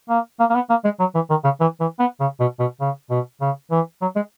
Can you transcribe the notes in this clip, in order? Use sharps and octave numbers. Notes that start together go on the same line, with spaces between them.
A#3
A#3
A#3
B3
A#3
G#3
F#3
E3
D#3
C#3
E3
E3
B3
C#3
B2
B2
C#3
B2
C#3
E3
F#3
G#3